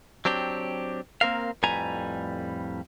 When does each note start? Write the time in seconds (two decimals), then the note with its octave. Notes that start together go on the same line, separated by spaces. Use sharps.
0.25 F#3 C4 D4 G4
1.21 A#3 C4 A#4 F5
1.63 F2 A2 G3 B4 G#5 A#5